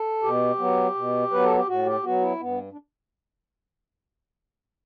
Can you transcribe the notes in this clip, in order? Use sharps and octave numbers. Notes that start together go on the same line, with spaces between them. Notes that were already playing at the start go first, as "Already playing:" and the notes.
Already playing: A4
B2 G4
F#3 B3
B2
F#3 B3 B4
A4
G4
A2 F#4
G4
F#3 B3 F#4
E4
G2 B3
D4